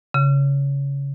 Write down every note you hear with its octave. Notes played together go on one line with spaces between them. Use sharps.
C#3